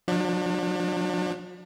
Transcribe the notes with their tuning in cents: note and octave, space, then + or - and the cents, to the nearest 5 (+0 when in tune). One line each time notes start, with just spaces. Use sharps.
F#3 -45 D4 +25